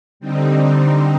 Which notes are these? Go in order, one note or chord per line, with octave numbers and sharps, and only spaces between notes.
D3 G3 C4 D#4